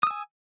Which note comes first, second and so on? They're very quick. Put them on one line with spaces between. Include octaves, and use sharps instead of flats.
D#6 E6 G#5